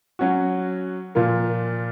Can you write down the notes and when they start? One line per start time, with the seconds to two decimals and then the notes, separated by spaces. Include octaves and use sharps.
0.19 F#3 C#4 F#4
1.15 A#2 F3 A#3 F4